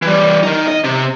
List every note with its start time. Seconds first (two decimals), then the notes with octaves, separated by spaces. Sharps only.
0.02 E3 G3
0.43 D#3 D#4
0.68 D#5
0.84 C3